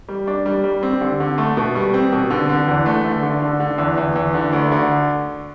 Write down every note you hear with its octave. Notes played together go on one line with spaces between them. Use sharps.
G3
D4
G3
G3
C4
D3
D3
A3
B2
G3
C4
B2
D3
D3
E2
A3
D3
D3
D3
D3
E2
E2
E2
D3
D2
D3